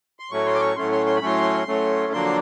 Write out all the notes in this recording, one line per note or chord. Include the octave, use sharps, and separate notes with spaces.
C6
A2 F#3 A3 C#4 C#6
C6
D6
C#6
A2 F#3 A3 C#4 C6
C6
C6
B5
A2 F#3 A3 C#4 C6
A2 F#3 A3 C#4
F2 D3 F#3 A#3 D4 C6